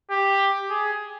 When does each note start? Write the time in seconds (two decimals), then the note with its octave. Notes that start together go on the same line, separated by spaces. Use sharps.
0.11 G4
0.70 G#4